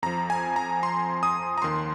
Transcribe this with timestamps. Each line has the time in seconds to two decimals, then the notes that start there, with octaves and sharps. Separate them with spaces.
0.02 F2 F3 A#5
0.30 G#5
0.56 A#5
0.83 C6
1.23 D#6
1.58 A#5
1.62 D#2 D#3 C6